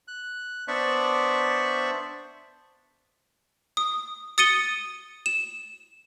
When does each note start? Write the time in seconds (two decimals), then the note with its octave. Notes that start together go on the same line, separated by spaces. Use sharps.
0.08 F#6
0.68 B3 D4 C5 D5 E5 C#6
3.77 D#6
4.38 D#6 A6 C#7 D#7 G7
5.26 E7